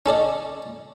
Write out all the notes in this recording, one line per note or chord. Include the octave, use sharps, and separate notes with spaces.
C#4 A4 D5 D#5